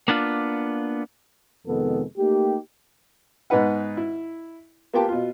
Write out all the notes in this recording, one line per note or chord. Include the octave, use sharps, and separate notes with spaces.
A#3 B3 D4 F4
F2 C3 D#3 G#3 B3 A4
A3 A#3 D#4 G4
G#2 B3 D#4 B4 F#5
E4
A#3 B3 F4 G4 G5 A5
B2 F4